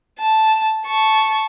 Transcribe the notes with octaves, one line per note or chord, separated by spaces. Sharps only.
A5
A5 C#6